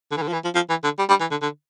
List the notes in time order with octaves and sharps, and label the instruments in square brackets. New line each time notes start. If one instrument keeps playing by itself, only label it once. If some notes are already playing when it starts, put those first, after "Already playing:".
[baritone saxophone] D3
E3
D3
F3
E3
F3
F3
E3
D3
G3
G3
E3
D3
D3